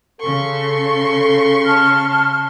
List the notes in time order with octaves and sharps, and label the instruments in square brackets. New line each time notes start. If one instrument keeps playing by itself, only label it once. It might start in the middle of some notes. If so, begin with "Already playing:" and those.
[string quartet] C#3 C6 C#6 [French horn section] A4
[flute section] A5 F6